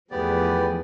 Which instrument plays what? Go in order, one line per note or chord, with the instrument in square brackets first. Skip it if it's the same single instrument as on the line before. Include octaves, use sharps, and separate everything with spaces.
[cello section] E2 F3 [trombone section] A3 G#4 B4 [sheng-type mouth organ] B3 G4 D5